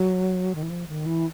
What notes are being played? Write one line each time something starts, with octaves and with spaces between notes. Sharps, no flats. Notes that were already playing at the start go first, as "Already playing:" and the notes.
Already playing: F#3
D#3
E3
F3
D#3
E3